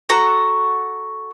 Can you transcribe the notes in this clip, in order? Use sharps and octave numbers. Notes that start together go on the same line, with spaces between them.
F#4 A4 F#5 A#5